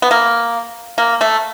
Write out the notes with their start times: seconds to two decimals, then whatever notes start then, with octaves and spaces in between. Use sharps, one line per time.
0.02 B3
0.11 A#3
0.98 A#3
1.21 A3